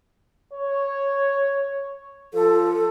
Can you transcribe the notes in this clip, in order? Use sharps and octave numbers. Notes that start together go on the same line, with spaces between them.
C#5
F3 A4